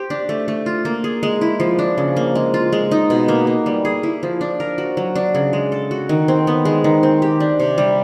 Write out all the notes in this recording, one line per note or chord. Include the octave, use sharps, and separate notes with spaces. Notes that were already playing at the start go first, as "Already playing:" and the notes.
Already playing: G4 C5
D4
A3
A3
F4
A#3
G#4
G#3
E4
F3
D4
C#3
A#3
G#3
F4
G#3
D#4
B2
A#3
A#3
G3
G#4
E4
F3
D4
A#4
F#4
F#3
D4
C#3
G#3
A4
F#4
D#3
C4
B3
G#3
D#3
C4
G4
D4
C3
G3